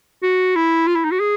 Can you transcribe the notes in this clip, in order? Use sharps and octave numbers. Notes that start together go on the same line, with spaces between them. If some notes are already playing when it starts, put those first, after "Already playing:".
F#4
E4
F4
E4
D#4
F#4
G#4